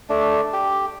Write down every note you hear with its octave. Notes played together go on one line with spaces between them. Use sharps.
A3 D4
G4